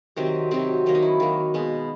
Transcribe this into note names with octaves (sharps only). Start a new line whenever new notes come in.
C3 D#3 F#3 C4
C3 D#3 F#3 C4
D#3 F#3 A#3
D#4
E4
D#3 F#3 A#3
B2 G#3 B3